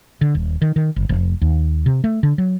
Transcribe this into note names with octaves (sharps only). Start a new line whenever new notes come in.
D3
D#1
D#3
D#3
G1
F1
D#2
C3
A3
D3
F#3